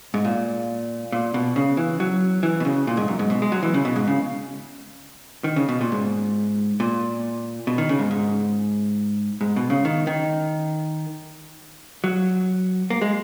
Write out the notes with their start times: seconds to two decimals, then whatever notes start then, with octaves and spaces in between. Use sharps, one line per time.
0.14 G#2
0.25 A#2
1.12 A#2
1.34 B2
1.56 C#3
1.77 E3
2.00 F#3
2.43 E3
2.60 B2
2.65 C#3
2.87 A#2
2.97 G#2
3.08 F#2
3.19 G#2
3.30 B2
3.42 G#3
3.52 F#3
3.63 E3
3.74 C#3
3.85 B2
3.96 G#2
4.07 C#3
5.44 D#3
5.56 C#3
5.69 B2
5.81 A#2
5.92 G#2
6.80 A#2
7.67 B2
7.78 D#3
7.89 C#3
7.99 G#2
8.11 G#2
9.41 G#2
9.56 B2
9.70 C#3
9.85 D#3
10.07 D#3
12.04 F#3
12.90 A#3
13.02 G#3